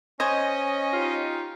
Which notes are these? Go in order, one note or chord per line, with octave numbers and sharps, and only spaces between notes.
C#4 C5 C#5 D#5 G#5
D#4 F4 G4